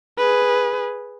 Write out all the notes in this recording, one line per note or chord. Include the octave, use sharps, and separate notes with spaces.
G#4 B4